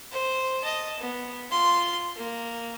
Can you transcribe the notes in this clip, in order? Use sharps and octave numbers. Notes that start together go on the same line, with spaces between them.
C5
D#5 A5
B3
F4 C6
A#3